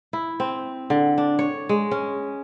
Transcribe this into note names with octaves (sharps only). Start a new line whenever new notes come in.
E4
C4
D3
D4
C#5
G#3
C#4